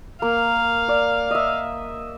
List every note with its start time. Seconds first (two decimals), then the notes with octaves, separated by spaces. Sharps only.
0.22 A#3 F5
0.88 D5
1.31 D#5 E5